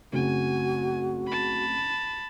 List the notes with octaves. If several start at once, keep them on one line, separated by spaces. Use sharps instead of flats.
F#1 A3 C4 F#4 G#5
A5 B5